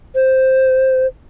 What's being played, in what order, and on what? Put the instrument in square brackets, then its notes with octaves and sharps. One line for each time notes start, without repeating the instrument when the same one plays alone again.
[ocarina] C5